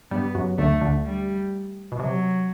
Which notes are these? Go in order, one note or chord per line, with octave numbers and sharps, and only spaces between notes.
G2 G3 B3
F#2 F#3
D2 D3 A3
D2 D3
G3
B2
C3 F#3